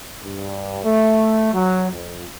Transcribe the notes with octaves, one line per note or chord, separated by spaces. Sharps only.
G2
A3
F#3
F2